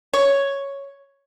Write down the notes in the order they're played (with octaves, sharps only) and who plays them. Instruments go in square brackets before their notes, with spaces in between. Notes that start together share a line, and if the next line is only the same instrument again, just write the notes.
[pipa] C#5